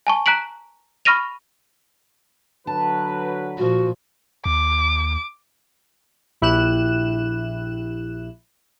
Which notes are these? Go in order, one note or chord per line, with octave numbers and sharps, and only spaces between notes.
G#5 A5 C#6
A#5 F#6 B6 D7 F#7
B5 C#6 F6 A#6 D#7 F7
D3 F#3 B4 A5
A#2 F3 F#4
D#2 D6
A#1 E4 G4 F#6 E7